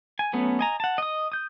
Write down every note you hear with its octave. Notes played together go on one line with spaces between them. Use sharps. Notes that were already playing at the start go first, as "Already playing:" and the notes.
G#5
F#3 A3 B3 C#4
D#5 G#5 A#5
F#5 A5
D#5 D#6
D#6 G6